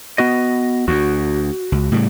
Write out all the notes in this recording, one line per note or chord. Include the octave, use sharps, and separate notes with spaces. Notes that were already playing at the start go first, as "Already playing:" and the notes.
B3 F#4 D#5
D2 F#4
C#2
A2 C#3 G3